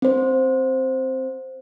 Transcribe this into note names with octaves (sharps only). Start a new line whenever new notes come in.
C4 C5